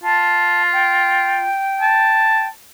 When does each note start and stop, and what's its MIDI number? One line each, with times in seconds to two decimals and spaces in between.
0.04 1.49 65
0.04 0.63 81
0.73 2.49 79
1.81 2.48 81